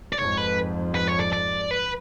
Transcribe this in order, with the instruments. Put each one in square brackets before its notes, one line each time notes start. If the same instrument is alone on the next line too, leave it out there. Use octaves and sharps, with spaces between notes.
[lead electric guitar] D5
[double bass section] F2 G#2 [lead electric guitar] C#5
[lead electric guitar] B4
B4
C#5
D5
D5
B4